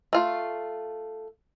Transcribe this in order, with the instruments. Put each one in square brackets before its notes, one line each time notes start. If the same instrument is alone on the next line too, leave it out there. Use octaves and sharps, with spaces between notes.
[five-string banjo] A3 F4